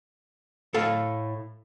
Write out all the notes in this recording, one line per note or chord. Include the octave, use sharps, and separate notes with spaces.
A2 A4 F5